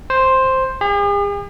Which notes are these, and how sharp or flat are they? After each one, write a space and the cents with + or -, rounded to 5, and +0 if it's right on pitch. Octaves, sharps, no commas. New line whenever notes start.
C5 +5
G#4 -45